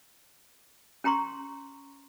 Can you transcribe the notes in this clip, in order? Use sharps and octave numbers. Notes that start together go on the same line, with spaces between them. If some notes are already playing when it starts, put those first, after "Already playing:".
C#4 G5 A#5 C6 C#6